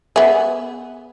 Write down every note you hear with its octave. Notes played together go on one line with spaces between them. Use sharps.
B3 G#4 E5